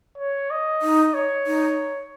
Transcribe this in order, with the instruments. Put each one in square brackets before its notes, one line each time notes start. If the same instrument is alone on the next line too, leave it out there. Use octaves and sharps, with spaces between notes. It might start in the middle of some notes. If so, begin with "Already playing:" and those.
[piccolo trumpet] C#5
D#5
[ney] D#4
[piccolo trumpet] C#5
[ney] D#4